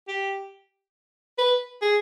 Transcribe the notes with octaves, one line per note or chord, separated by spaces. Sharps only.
G4
B4
G#4